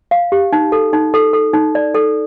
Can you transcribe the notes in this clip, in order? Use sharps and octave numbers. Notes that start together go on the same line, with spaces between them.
F5
G4
D#4
A4
D#4
A4
A4
D#4
D5
A4